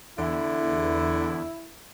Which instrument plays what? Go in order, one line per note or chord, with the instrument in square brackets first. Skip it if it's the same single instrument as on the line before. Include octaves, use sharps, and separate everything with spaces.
[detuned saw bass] E2 [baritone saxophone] D3 [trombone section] E4